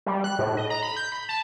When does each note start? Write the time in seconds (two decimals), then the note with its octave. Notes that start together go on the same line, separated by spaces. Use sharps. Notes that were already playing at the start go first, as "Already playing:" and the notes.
0.06 G3
0.24 F#6
0.39 A2
0.57 D#5
0.70 A#5
0.82 B5
0.96 G6
1.12 B5
1.29 A5